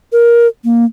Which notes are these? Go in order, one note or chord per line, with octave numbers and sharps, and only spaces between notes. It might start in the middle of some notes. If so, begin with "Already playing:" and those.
A#4
A#3